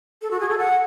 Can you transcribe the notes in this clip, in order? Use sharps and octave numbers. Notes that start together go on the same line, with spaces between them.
A4
F#4
G#4
A4
F#5